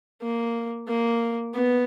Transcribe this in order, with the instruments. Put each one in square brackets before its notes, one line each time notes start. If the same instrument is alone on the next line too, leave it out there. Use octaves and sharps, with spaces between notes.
[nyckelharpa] A#3
A#3
B3